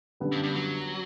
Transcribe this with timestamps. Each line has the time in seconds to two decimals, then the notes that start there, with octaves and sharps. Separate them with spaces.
0.20 F#2 D3 G3 B3
0.32 G2
0.43 G2
0.55 F#3